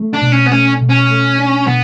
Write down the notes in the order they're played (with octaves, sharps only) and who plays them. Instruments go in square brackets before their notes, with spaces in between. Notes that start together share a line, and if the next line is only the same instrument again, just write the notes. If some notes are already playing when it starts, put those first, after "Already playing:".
Already playing: [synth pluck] A3
[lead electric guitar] D4
[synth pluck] B2
[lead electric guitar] C#4
B3
[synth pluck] A3 [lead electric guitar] C#4
[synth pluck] B2
[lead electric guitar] C#4
[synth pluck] A3
D4
[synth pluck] B2 [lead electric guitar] B3